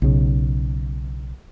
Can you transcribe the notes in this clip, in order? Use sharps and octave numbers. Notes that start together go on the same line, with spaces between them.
B1 C#3